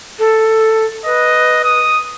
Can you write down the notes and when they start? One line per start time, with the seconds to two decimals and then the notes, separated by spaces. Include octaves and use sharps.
0.18 A4
1.05 B4 D#5
1.64 D#6